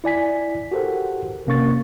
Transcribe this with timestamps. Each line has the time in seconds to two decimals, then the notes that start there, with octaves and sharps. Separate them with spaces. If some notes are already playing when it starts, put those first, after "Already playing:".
0.04 E4 D5 G#5 B6
0.72 F#4 G4 A4 A#4 C5 F#5
1.46 G1 C3 A#3 C#4 C#6 A6